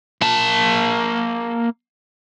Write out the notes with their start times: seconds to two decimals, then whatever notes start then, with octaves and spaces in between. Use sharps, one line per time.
0.22 A#3 A5